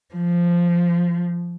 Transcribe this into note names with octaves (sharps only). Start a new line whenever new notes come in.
F3